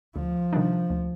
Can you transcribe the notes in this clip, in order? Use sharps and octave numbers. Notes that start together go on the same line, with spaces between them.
D2 F3
C3 D#3 G3 D4
D2